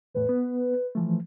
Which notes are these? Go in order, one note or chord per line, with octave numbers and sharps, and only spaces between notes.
E2 A2 B4
B3
E3 F3 A3